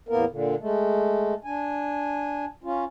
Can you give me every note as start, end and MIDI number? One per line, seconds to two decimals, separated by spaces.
0.09 0.25 40
0.09 0.25 45
0.09 0.25 58
0.09 0.25 59
0.09 0.25 70
0.30 0.55 46
0.30 0.55 50
0.59 1.34 56
0.59 1.34 57
1.45 2.45 62
1.45 2.45 80
2.64 2.84 61
2.64 2.84 65